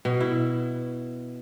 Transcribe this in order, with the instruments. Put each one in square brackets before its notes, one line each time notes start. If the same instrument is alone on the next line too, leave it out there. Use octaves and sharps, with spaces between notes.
[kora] B2
E4